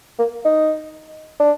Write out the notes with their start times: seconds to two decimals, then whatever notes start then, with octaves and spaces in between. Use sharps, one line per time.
0.19 A#3
0.45 D#4
1.39 D4